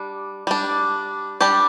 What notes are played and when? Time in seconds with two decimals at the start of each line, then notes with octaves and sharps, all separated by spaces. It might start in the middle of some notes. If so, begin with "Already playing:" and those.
Already playing: G3 D4
0.47 G3 D4
1.41 G3 D4 G4